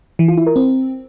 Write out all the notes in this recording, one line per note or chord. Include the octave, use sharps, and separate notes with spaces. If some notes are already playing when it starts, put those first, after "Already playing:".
E3
F4
E4
A#4
C4